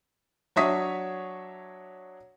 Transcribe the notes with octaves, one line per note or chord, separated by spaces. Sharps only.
F#3 D4 C#5 E5 D#6 B6